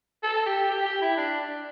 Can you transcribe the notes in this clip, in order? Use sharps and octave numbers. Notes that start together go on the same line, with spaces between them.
A4
G4
G4
G4
E4
D4
D4